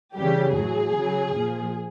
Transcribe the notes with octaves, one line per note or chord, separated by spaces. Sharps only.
C#3 E3 G3 G4
A2 F#3 G#4
C#3 F#3
A#2 F3